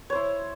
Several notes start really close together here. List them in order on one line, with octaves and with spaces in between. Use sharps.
C#5 C5 E4